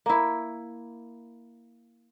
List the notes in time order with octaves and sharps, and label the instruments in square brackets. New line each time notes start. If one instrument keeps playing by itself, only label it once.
[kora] A#3 E4